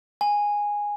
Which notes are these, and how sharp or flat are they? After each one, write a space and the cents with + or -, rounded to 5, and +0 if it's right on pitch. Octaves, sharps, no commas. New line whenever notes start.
G#5 -10